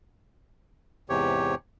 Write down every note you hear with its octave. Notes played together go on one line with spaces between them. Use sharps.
E2 G#2 C3 G4 C#5